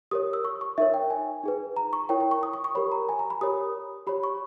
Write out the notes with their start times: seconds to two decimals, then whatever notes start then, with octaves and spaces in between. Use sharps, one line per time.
0.11 G4 A#4 C#5 D#6
0.33 E6
0.45 C#6
0.61 C#6
0.78 D#4 A#4 C#5 E5
0.94 G5
1.10 G#5
1.43 D#4 G#4 B4
1.77 A#5
1.93 C#6
2.09 E4 A#4 C#5 G5
2.20 G5
2.31 C#6
2.43 D#6
2.53 C#6
2.64 C#6
2.75 G4 A#4 C#5 B5
2.92 A#5
3.09 G#5
3.19 A#5
3.30 B5
3.41 G4 A#4 C#5 D#6
4.07 G4 C#5 B5
4.23 C#6